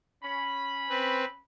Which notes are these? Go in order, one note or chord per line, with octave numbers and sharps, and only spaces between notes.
C#4 B5
C4 B4